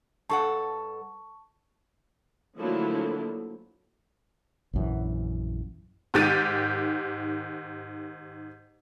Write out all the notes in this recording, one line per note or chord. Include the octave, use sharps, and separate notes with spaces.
G2 A4 F#5 A5 C#6
D3 F3 F#3 A3 A#3 E4
A#1 F#2 E3
G#2 D#3 G4 A6 D#7